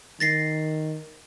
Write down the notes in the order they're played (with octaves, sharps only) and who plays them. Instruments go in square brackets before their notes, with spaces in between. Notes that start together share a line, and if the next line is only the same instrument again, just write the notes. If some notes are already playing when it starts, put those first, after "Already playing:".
[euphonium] D#3 [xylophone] A6 A#6 C7